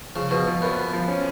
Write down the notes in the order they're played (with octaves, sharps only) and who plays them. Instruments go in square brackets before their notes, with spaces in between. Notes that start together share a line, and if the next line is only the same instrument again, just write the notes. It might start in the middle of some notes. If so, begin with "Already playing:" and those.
[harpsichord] C#3 [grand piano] F3
[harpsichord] B2 [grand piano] F3
[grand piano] F3
[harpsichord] F#2 [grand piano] B3
[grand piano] B3
F3
C#4